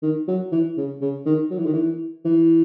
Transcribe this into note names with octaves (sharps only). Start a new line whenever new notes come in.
D#3
F#3
E3
C#3
C#3
D#3
F#3
E3
D#3
E3
E3